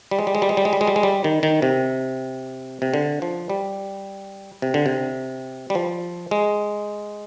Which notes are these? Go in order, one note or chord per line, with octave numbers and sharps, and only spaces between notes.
G3
G#3
G3
G#3
G3
G#3
G3
G#3
G3
G#3
G3
G#3
G3
D#3
D#3
C3
C3
D3
F3
G3
C3
D3
C3
G3
F3
G#3